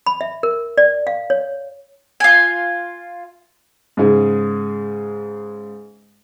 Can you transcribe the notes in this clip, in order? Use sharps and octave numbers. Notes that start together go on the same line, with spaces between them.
B5
E5
A#4
D5
F5
C#5
F4 G#5
G#2 C#3 G#3